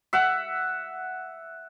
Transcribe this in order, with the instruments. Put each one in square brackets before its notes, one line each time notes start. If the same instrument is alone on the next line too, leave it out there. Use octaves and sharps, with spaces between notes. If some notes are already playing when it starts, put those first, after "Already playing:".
[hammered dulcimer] E5 F#5